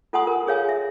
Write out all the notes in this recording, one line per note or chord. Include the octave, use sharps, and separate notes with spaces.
F4 A4 F#5 G#5 C6 D#6
A#4
G#4 C#5 F5 G#5
E5